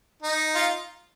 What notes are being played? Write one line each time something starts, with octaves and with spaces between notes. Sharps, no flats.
D#4
F4